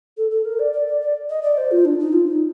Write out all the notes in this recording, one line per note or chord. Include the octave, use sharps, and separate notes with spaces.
A4
A4
A#4
D5
D5
D5
D5
D#5
D5
C5
F4
D4
D#4
F4
D#4